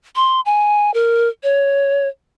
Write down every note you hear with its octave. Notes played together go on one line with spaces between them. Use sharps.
C6
G#5
A#4
C#5